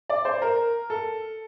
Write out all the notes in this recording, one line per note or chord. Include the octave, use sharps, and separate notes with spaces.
D5
C5
A#4
A4